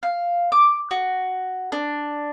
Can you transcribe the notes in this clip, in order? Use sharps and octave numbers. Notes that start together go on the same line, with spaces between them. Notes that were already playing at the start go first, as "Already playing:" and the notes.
F5
D6
F#4
D4